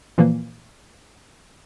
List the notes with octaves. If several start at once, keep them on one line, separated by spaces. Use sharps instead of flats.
A#2 E3 F3 A#3